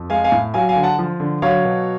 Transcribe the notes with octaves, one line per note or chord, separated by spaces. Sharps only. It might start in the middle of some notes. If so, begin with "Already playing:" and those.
Already playing: F2
G#3 F5 G#5
F5 G#5
A2
F#3 F5 G#5
F5 G#5
D3
F#5 A5
F3
D3
F#3 C#5 F5
B2